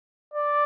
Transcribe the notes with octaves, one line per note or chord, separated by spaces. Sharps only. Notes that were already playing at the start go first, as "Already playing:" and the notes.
D5